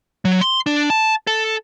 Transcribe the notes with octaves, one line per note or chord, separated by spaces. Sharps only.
F#3
C6
D4
A5
A4